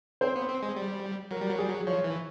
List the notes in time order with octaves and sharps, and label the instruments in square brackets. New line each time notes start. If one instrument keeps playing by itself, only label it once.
[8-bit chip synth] C4 [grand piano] C5
[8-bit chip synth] B3
C4
G#3
G3
[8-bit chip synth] F#3 [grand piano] A#4
[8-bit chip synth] G3
F#3
[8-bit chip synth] G3 [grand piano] G#4
[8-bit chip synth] F#3
[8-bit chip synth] F3 [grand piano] C#5
[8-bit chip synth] E3